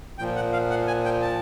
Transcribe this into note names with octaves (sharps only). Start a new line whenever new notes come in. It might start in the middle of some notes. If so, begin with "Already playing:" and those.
A#2 F3 G5
F#5
F5
F#5
G#5
G5
A5